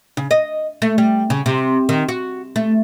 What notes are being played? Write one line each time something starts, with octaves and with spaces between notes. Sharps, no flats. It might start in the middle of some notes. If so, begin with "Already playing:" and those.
C#3
D#5
A3
G3
C#3
C3
D#3
F#4
A3